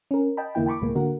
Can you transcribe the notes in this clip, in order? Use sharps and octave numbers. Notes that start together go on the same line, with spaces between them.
C#4 A#4
D#5 G5 A5 B5
E2 D3 A#3 E4 G5
G5 A5 B5 C#6 D6
C#2 A2 G#3 A#3
D3 A#3 F#4 A#4